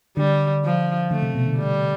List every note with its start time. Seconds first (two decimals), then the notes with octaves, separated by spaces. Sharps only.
0.17 D3 G3
0.64 F3
1.11 D3 A3
1.22 C3
1.35 B2
1.46 D3
1.58 G3